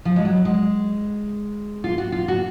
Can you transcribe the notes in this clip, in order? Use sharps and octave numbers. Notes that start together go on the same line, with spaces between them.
F3
G#3
F#3
G#3
F4
F#4
F4
F#4